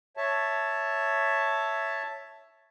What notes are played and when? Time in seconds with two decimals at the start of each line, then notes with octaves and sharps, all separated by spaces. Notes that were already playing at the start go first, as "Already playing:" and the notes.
0.17 C#5 E5 A5